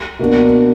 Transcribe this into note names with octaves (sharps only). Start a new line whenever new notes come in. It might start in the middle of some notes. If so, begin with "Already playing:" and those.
B2 A#3 D4 F#4